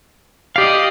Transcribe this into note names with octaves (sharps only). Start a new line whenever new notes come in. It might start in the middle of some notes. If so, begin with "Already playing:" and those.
G4 D5 D#5 F5